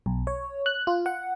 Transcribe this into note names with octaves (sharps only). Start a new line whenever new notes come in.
B1
C#5
F#6
F4
F#5